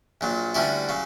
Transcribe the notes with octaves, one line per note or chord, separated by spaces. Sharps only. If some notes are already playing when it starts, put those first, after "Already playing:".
A#1 A#2 F#3
D2 D3 G3 C#4 E4
C#3 F#3